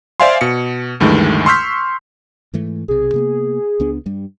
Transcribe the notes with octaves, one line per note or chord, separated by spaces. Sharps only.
C5 D5 E5 F5 G#5 C6
B2 C#7
D2 G2 D#3 E3 G#3 A3
C6 C#6 E6 F6 G6 B6
G#2 E3 A3
B1 C3 G#4
C3 A#3 B3
C#2 B3 D4
G2 G3